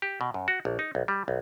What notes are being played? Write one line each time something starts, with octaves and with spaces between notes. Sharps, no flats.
G4
B2
F#2
F#4
A#1
D#4
B1
G3
B1